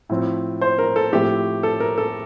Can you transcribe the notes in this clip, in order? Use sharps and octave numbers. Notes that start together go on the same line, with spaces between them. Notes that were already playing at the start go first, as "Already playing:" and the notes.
A2 F3 C4
C5
A#4
A4
A2 F3 A3 C4 G4
A4
A#4
A4